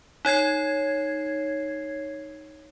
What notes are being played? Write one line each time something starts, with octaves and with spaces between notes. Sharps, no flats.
D#4 C#5 G#6 C7